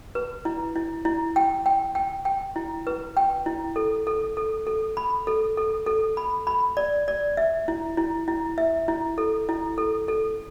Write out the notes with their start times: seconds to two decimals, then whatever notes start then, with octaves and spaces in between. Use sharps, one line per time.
0.15 B4
0.45 E4
0.76 E4
1.05 E4
1.36 G5
1.66 G5
1.95 G5
2.25 G5
2.56 E4
2.87 B4
3.17 G5
3.46 E4
3.76 A4
4.07 A4
4.37 A4
4.67 A4
4.97 B5
5.27 A4
5.57 A4
5.86 A4
6.17 B5
6.47 B5
6.77 D5
7.08 D5
7.37 E5
7.68 E4
7.97 E4
8.28 E4
8.58 E5
8.88 E4
9.18 A4
9.49 E4
9.78 A4
10.08 A4